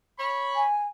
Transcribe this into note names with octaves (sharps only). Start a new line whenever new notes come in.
C#5 B5
G#5